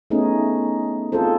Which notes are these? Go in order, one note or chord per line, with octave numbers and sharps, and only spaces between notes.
A3 B3 C#4 D#4 G#4
C4 F4 G#4 A4 C5